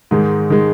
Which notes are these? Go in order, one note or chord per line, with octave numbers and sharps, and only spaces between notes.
G#2 D#3 G#3
D#3 G#3